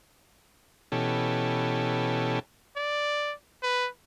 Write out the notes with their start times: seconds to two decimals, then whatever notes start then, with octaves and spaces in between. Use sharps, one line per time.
0.92 B2 E3 C#4 G4 A4
2.76 D5
3.63 B4